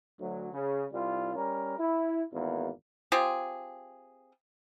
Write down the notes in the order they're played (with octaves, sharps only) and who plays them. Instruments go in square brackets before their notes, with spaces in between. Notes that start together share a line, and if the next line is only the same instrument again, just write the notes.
[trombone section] D2 F#3
C#3
C2 G3 F4
G3 C#4 A#4
E4
G#1 E2 A#3 B3
[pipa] C4 F4 G4 G#4